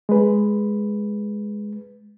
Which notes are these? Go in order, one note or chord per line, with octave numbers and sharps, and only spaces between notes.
G#3 B4